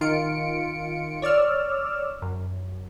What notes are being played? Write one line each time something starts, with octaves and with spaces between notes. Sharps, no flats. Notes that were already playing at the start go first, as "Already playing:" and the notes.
D#3 F4 C#7 D7
C#5 D5 E6 F6
F#2